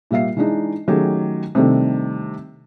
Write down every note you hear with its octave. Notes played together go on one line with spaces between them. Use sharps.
A#2 G3 E5 F5 C7
E3 G#3 D4 D#4
D#3 F#3 A3 C#4 G4 G#4
C3 D#3 G3 A3 C4 D4